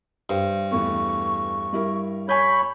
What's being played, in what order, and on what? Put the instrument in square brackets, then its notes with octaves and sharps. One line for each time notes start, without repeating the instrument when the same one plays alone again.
[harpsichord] G2 [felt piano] C5
[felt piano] E2 A3 B3 [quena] C#6
[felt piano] G3 E4 A#4
[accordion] C#5 B5 [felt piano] G#5 G6